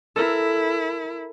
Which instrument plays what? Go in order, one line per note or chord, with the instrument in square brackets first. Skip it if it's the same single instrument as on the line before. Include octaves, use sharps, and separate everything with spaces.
[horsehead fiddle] E4 [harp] A4 A#4